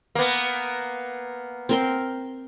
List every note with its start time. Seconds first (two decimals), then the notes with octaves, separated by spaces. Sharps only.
0.15 A#3 B3
1.69 C4 A#4 C6